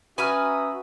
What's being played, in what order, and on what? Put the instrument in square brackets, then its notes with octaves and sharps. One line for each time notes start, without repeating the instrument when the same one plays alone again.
[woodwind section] C#4 E5 D#6 [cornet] F#4 [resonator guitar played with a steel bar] B4 [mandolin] G#5 A#5 F6